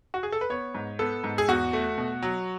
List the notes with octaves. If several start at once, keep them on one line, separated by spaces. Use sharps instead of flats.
F#4
G#4
A4
B4
B3 C#5
G#2
B3 A4
G#2
G#4
E2 F#4
A3
B2
F#3